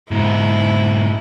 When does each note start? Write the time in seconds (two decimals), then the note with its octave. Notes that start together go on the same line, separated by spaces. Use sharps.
0.11 G#2 B2 E4